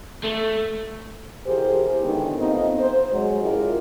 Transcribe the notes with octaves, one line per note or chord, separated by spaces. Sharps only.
A3
B2 E3 G4 G#4 A#4 C5
A2 D3 D#3 G#3 B3 G4
A3 B3 C4 D#4 F4
C5
F#3 G#3
C#4 E4 F4 G4 G#4 A#4